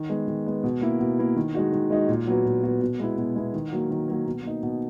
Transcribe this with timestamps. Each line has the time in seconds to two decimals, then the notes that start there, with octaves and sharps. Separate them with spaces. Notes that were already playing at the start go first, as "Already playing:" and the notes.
Already playing: D#3
0.10 G#3 B3
0.28 D#3
0.46 G#3 B3
0.63 B2
0.82 A#3 E4
1.00 B2
1.19 A#3 E4
1.36 D#3
1.55 G#3 D#4 F#4
1.73 D#3
1.90 G#3 D#4 F#4
2.08 A#2
2.27 F#3 B3 F#4
2.45 A#2
2.63 F#3 B3 F#4
2.81 B2
3.00 G#3 B3 E4
3.17 B2
3.35 G#3 B3 E4
3.54 D#3
3.72 F#3 A#3
3.90 D#3
4.08 F#3 A#3
4.26 B2
4.44 A#3 D#4
4.63 B2